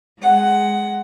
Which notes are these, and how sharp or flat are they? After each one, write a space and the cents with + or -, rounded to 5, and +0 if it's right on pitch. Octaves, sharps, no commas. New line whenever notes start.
G#3 +0 F#5 +15